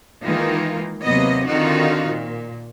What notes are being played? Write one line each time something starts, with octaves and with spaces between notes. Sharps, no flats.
D#3 E3 G#3 A#3 D#4 F4
D#2 C3 F#3 A#3 B3 D#5
D3 D#3 C4 D#4 F4 F#4
A#2